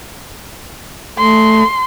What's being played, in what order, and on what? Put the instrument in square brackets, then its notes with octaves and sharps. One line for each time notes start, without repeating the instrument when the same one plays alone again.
[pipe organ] A3 [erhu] C6